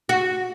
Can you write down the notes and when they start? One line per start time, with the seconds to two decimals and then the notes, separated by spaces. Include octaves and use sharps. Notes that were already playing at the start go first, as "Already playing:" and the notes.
0.09 F#4